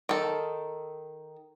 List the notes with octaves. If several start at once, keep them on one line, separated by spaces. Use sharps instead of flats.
D#3 A4